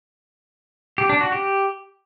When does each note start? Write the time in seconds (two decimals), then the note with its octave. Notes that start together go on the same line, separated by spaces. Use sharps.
0.98 G4
1.09 D4
1.21 F#4
1.32 G4